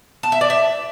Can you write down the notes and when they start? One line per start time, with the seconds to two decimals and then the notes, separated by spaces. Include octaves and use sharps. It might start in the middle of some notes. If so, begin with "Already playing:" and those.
0.23 A5
0.32 E5
0.41 D5
0.50 E5